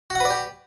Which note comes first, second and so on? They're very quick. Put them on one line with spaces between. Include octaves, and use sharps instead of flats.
F#4 F#5 B4 D5 G4